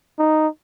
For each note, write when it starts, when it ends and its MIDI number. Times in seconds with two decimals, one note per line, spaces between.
0.19 0.47 63